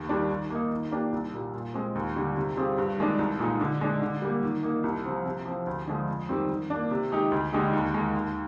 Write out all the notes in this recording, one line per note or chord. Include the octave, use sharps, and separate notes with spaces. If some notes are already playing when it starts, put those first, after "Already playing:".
Already playing: D#2
D#3 G3 D4
D#3
A#3 D#4
D#3
A#3 D4 G4 A#4
C2
A#2 G3
A#2
G#3 C4
D#2
D3 G3
C3
G3 C4 F4 G#4
G2
D#3 G#3 D4
C2
A#2 G#3 D#4
D3
G#3 D4
D3
G3 A#3
D#3
A#3 D#4
C2
C3 F3 C4
C3
F3 C4
D2
D3 F3 G#3
F2
D#3 G3 C4
D#3
A#3 D4
C3
D#3 G#3 D#4 G4
D2
D3 G#3 D#4 G4
D#2
D#3 G#3
D#2